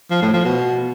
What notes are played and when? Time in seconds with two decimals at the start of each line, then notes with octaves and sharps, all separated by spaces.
0.11 F3
0.22 A2
0.33 F3
0.45 B2